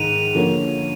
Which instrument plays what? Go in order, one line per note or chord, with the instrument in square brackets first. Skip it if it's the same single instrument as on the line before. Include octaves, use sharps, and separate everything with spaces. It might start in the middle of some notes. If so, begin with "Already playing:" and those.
Already playing: [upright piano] G#2 D#3 G#3 [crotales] D#7 F7
[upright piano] D3 F3 A#3 C#4